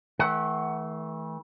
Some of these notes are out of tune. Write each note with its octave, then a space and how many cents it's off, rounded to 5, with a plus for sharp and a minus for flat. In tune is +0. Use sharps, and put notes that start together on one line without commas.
E3 -40 A3 -15 F#5 +15